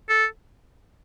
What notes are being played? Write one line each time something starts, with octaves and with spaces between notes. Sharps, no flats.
A4